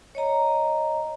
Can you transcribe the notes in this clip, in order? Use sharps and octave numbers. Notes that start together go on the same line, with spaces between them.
C#5 D#5 A#5